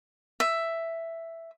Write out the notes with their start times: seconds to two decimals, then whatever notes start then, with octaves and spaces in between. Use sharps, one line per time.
0.40 E5